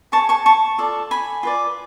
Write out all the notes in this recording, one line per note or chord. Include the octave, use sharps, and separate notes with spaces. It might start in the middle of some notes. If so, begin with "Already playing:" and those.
G#4 C#5 A5 C#6
A5 C#6
A5 C#6
F4 A4 D5
G#5 B5
F4 B4 D5